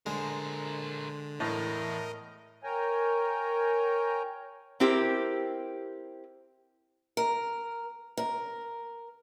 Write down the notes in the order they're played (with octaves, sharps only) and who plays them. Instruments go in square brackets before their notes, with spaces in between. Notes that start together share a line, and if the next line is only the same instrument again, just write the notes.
[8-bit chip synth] D3 [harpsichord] G#3 [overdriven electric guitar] A#4 C5
[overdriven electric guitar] E2 [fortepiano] A2 [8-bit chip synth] A#4 D#5
[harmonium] A#4 C#5 G5 G#5 A#5
[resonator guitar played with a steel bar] C4 E4 G4 A#4 C5
[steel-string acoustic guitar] A#4
A#4